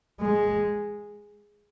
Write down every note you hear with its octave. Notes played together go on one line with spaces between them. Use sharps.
G#3